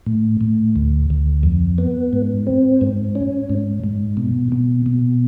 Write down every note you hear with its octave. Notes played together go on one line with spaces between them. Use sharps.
A2
A2
D2
D2
F2
B3
G#2
C4
G#2
C#4
G#2
G#2
B2
B2
B2